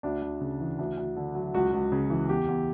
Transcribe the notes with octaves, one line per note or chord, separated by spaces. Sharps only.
D2 D4
D2
C#3
E3
D2
D2
D3
F#3
C#2 F#4
C#2
C#3
E3
E2 G4
E2